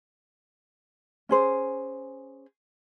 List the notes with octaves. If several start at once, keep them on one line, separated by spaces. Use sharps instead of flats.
C#4 G#4 C5